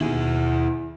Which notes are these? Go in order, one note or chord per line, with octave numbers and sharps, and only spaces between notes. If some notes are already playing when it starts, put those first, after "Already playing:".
D#2 B2 E4 G#4